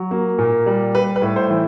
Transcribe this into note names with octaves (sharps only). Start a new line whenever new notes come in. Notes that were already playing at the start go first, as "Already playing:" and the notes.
Already playing: F#3
A#3
A#2
G3
G3 B4
B4
A2
C5
E3